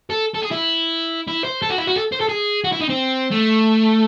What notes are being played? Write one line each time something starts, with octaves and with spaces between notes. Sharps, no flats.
A4
A4
G#4
E4
E4
C5
A4
F#4
E4
F#4
A4
C5
A4
G#4
F#4
E4
D#4
C4
A3